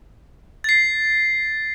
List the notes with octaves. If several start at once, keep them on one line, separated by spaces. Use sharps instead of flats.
A6 C7